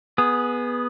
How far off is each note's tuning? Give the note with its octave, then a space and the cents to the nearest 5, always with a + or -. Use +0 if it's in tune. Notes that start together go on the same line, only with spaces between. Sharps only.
B3 -10 G#4 +0